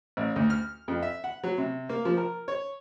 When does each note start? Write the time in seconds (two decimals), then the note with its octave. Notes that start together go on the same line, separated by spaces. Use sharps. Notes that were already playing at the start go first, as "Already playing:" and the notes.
0.17 A1
0.36 D2
0.50 F6
0.88 F2
1.02 E5
1.24 F#5
1.44 F#3
1.58 C3
1.89 A#3
2.05 F3
2.17 A#4
2.48 C#5